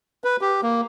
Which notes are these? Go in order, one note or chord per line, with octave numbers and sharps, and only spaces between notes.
B4
G4
A#3